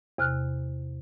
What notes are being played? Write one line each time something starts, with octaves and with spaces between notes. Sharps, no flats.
E2 C3 F6 F#6